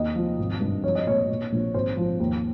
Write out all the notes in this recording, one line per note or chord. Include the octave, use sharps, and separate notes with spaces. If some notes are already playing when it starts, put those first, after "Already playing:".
Already playing: D#2 D#5
F3
G#1
G2
F3 C#5
D#5
A#2 C#5
A#2
A#1
G#1 C5
F3
D#2